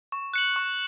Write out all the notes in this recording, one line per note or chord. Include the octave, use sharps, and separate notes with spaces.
C#6
F#6 C#7 F#7
C#6